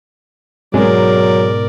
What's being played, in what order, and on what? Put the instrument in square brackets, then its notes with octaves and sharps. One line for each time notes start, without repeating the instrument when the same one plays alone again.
[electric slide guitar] G#2 B2 [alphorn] F#3 [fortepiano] G#3 G#4 [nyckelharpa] A#4 D5